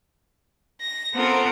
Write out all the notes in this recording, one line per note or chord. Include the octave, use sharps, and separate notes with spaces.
A#6
B3 C4 F4 A4 A#4